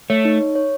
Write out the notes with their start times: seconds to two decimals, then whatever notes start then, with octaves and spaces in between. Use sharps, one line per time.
0.10 A3 C#5
0.25 D#4
0.41 C#5
0.55 C#5